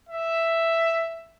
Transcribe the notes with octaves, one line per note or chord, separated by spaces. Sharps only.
E5